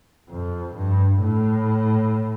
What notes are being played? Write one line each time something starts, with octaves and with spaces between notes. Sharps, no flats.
F2
G2
A2